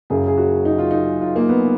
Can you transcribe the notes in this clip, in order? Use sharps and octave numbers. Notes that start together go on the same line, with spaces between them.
F#1 F#2 C#3 G#4
G#4
F#4
D#4
F4
D#4
F4
A#3
B3